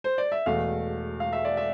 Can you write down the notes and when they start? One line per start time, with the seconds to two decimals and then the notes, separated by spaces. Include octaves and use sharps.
0.04 C5
0.18 D5
0.32 E5
0.46 E1 E2 B2 A3 F5
1.20 F5
1.33 E5
1.45 D5
1.57 E5